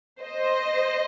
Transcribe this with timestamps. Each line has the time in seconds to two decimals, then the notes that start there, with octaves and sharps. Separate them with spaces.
0.22 C5 D#5